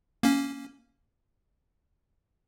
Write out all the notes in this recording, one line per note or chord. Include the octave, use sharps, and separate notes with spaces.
A#3 C#4